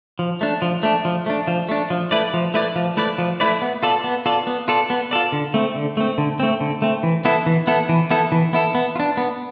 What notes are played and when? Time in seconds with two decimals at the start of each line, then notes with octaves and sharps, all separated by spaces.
0.19 F3
0.41 A3 D4
0.62 F3
0.83 A3 D4
1.05 F3
1.26 A3 D4
1.48 F3
1.69 A3 D4
1.90 F3
2.11 A3 E4 B4 D5
2.34 F3
2.54 A3 E4 B4 D5
2.76 F3
2.97 A3 E4 B4 D5
3.18 F3
3.40 A3 E4 B4 D5
3.62 B3
3.83 F4 A4 D5
4.04 B3
4.26 F4 A4 D5
4.47 B3
4.68 F4 A4 D5
4.90 B3
5.11 F4 A4 D5
5.32 D3
5.54 A3 C4
5.75 D3
5.97 A3 C4
6.18 D3
6.40 A3 C4
6.60 D3
6.82 A3 C4
7.03 E3
7.25 B3 E4 A4
7.46 E3
7.67 B3 E4 A4
7.89 E3
8.11 B3 E4 A4
8.32 E3
8.53 B3 E4 A4
8.75 B3
8.96 F4
9.00 D4
9.17 B3